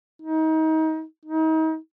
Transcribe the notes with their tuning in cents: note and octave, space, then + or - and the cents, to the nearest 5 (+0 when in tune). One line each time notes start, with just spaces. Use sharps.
D#4 +30
D#4 +35